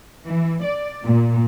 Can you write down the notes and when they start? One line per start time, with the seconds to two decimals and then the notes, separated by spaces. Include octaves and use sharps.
0.25 E3
0.63 D5
1.03 A#2